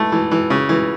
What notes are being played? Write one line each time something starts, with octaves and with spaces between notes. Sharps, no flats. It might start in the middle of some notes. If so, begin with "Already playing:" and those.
Already playing: E3 A3
E3
E3
C#3
E3